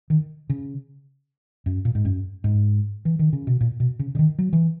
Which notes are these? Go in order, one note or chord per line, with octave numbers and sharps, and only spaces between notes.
D#3
C#3
F#2
A#2
G#2
F#2
G#2
E3
D#3
C#3
B2
A#2
B2
C#3
C#3
D#3
F#3
E3